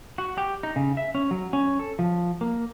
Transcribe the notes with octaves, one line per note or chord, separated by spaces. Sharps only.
F#4
G4
D#4
C#3
E5
C#4
F#3
C#4
A4
F3
A#3